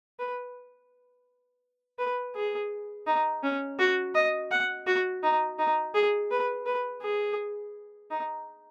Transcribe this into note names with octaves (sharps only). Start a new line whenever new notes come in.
B4
B4
G#4
D#4
C#4
F#4
D#5
F#5
F#4
D#4
D#4
G#4
B4
B4
G#4
D#4